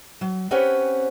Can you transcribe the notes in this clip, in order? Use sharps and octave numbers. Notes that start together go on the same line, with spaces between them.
F#3
C4 C#4 G4 B4 C#5 F#5